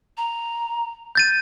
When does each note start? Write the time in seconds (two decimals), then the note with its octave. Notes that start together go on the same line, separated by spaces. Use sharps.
0.17 A#5
1.15 G6 A6 D#7